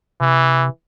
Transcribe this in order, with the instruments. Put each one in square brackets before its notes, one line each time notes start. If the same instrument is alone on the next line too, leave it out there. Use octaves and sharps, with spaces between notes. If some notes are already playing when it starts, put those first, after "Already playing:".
[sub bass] C3 [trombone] E3